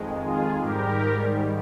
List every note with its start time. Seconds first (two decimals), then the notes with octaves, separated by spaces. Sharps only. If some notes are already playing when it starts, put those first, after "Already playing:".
Already playing: F2 D#3 G#3
0.24 F4 G#4
0.61 G#2 D#3 G3 G4 A#4